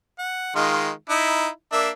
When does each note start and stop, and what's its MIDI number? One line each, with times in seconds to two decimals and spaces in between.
0.19 0.51 78
0.56 0.90 51
0.56 0.90 56
0.56 0.90 65
1.10 1.48 63
1.10 1.48 64
1.72 1.89 58
1.72 1.89 62
1.72 1.89 76